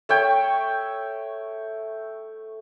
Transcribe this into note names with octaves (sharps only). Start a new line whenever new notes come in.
A3 C#5 G5